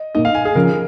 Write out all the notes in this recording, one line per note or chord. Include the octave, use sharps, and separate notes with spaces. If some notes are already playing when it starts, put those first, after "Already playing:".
Already playing: D#5
A#2 A#3 D#4 D#5
F5
G#5
G#4
C#3 F3 C#4 A#4